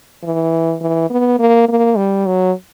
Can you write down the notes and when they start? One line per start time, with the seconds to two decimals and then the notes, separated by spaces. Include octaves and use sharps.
0.23 E3
0.81 E3
1.10 B3
1.39 A#3
1.68 A#3
1.97 G3
2.26 F#3